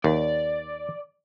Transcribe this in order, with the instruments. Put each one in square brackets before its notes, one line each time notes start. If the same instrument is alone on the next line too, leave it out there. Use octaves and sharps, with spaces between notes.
[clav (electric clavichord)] D#2 [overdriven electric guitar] D5